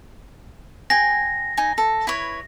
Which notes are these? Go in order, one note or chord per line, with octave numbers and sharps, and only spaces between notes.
G#4 G5 G#5 A#6
D#4 G#5
A4
E4 B4 C#5